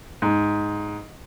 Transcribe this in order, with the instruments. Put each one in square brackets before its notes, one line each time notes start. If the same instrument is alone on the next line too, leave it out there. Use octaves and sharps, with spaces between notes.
[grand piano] G#2